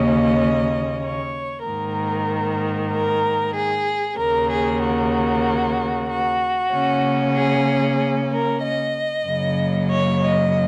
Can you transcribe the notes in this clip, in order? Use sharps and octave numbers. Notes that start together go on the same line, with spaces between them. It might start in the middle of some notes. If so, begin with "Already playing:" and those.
Already playing: D#2 C#3 A#3 C#4 D#5
C#5
G#2 D#3 A#3 A#4
A#4
G#4
D#2 C#3 A#3 A#4
G#4
F#4
F#4
C#3 A#3 C#4
G#4
A#4
D#5
F#2 C#3 F#3 A#3
C#5
D#5